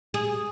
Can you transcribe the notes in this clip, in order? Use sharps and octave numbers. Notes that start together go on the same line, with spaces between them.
G#4